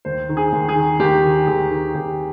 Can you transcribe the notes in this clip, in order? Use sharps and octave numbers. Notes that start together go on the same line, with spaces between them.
D#2 C5
D#3
G#4
D#2
G#4
D#3
D#2 G4
D#3
D#2 G#4
D#3
D#2 G4